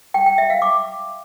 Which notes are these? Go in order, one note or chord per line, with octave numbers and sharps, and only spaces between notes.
G5
G5
E5
F5
D6